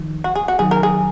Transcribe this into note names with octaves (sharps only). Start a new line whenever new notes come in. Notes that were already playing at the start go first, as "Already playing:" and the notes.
Already playing: D#3 F3
F#4
G#4
F#4
D#3 F#3 G#4
A#4
G#4